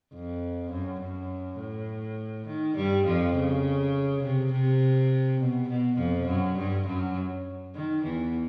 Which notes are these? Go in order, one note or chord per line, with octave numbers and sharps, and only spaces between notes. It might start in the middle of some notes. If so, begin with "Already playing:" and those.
F2
F#2
F#2
A2
D#3
G2 G3
F2 F3
C#3
C3
C3
B2
B2
F2 F3
F#2 F#3
G2 G3
F#2 F#3
D#3
E2 E3